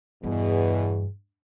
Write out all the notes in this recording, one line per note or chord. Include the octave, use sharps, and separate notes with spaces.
E2 G2 B2 G#4